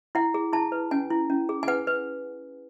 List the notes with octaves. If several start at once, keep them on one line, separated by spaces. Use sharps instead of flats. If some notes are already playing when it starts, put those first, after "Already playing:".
E4 F#5
G#4
E4 A5
B4
C#4 G#5
E4
C#4
G#4
G#5
B4 F#5
B4